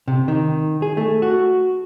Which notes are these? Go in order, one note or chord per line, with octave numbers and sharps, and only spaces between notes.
C3
D#3
G#4
A3
F#4